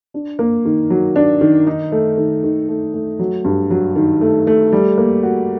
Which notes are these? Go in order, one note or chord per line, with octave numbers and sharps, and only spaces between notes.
D4
A#3
D#3
F#3
D4
D#3
D#4
A3
D#3
D#3
A3
A3
F#3
G2
F#3
D#3
A3
A3
G3
A#3
F#4